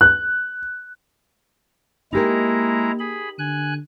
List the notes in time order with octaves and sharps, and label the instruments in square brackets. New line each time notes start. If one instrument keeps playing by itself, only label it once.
[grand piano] F#6
[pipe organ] G#3 E4 A#5 [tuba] A#3 [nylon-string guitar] D#4 G4 A#4
[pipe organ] G#4 B5
[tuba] D3 [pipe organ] G#5 F#6